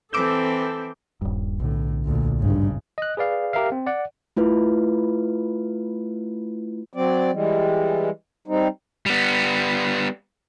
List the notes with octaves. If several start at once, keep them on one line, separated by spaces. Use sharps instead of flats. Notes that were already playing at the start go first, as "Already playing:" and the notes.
E3 C4 A4 D6 E6 G6
D#1 G2
B1 A2 D3
D2 A#2
G#1 G2 C#3
D#5 F#6
G#4 B4 D5 F5
G4 A#4 E5 F5
C4
D5 F#5
A3 E4 F4 B4
F#3 C4 D5
E3 G3 G#3
G3 C4 D#4
G3 B3